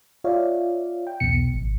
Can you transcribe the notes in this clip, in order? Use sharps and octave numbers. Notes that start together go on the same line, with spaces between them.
F4 C#5 D5 E5 F5
G5
B1 E2 B2 C#7
G#1